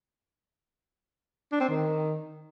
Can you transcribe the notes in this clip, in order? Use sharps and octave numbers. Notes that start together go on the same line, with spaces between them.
D4
C4
D#3